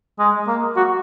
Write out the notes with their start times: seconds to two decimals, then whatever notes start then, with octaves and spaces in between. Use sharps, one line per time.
0.19 G#3
0.48 A#3
0.77 F#4